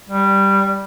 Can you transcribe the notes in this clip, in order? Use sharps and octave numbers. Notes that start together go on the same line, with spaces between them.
G3